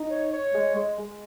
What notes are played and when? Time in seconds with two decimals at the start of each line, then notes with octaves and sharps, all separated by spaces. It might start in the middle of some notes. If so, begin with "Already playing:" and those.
Already playing: D#4
0.09 C#5
0.32 C#5
0.53 G#3
0.75 G#3
0.98 G#3